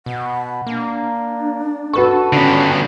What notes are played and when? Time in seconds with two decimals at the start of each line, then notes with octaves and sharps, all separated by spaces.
0.06 B2 F#5
0.66 A#3 D4
1.93 F#4 A4 B4 C#6
2.33 D3 B3 C#4